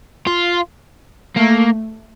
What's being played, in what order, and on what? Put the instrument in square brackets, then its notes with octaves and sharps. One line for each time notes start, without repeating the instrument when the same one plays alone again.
[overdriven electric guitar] F4
[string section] A3 [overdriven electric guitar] A#3